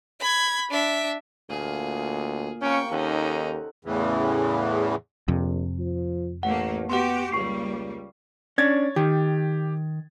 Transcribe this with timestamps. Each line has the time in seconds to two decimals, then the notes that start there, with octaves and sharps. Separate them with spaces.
0.20 B5 G#6
0.71 D4 E5
1.50 D2 A#2 G#4
2.61 C3 A#3 C#4 G5 C#6
2.91 D#2 C#4 D#4 A4 F#5
3.85 E2 A2 C#3 E3
5.28 A#1 F2 C3
5.79 F3
6.43 A1 A3 A#3 F#5
6.90 B3 F#4 G4 F#5 C6
7.32 C#2 G3 A#3 C#6 C7
8.58 C#4 D4 C#5 G#6 A6
8.96 D#3 G4